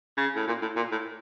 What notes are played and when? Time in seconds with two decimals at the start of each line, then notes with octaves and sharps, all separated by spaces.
0.17 C#3
0.35 A2
0.47 A#2
0.62 A2
0.76 A#2
0.92 A2